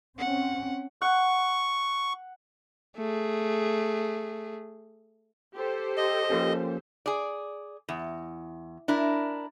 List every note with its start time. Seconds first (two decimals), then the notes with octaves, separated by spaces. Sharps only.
0.18 C4 C#4 F#5
1.02 F#5 C#6
2.97 A3 G#4
5.55 G4 A4 C5
5.97 D#5
6.30 F3 A#3 C#4
7.06 G#4 D5
7.89 E2
8.88 D4 E4 A#4